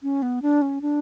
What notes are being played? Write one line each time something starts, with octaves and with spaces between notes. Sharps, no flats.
C#4
B3
D4
C#4
D4